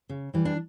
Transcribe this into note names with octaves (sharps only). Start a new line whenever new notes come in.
C#3
E3 G3
D4